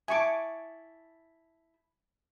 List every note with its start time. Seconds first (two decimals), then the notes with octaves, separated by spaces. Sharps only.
0.08 E4 G#5 A5 C#6 D6